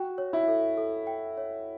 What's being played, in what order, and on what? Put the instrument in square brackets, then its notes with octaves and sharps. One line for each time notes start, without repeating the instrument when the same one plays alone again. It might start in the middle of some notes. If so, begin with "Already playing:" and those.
Already playing: [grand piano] F#4 [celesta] G5
[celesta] C#5
[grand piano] E4
[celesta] A4
A4
G5
C#5